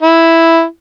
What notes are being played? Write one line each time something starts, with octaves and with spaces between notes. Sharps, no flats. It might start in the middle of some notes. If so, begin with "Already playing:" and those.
E4